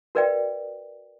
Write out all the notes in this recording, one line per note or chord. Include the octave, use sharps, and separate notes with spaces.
F#4 A#4 B4 D5 E5 G5